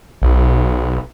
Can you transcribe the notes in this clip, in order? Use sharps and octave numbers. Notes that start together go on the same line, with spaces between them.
B1